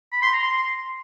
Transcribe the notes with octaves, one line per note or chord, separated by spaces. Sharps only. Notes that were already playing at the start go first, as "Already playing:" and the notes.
B5
C6
A#5
C6